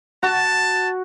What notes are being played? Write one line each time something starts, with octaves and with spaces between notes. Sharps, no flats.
F#4 A5